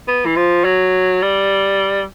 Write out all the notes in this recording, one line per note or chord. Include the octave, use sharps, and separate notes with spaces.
B3
E3
F3
F#3
G3